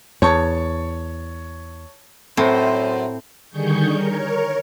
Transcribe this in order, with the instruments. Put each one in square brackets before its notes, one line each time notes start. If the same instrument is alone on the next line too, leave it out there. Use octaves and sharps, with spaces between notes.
[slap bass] E2 [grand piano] C#5 A5 C#6
[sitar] F#2 [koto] A2 [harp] C4 [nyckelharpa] C5
[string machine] D3 D#3 G3 G#4 C#6 G6
A#4 C#5